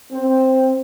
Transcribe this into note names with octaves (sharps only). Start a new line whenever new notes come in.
C4